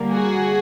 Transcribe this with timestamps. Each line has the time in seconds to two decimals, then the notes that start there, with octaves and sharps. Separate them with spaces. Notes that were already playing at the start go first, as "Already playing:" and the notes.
Already playing: D3 G3 A#3
0.13 F#4 G#4